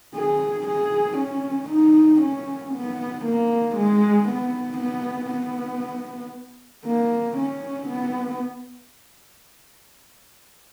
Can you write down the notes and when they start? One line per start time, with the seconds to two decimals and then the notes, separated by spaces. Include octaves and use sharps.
0.15 G#4
0.67 G#4
1.18 C#4
1.70 D#4
2.21 C#4
2.73 B3
3.25 A#3
3.77 G#3
4.28 B3
4.79 B3
5.31 B3
6.85 A#3
7.37 C#4
7.88 B3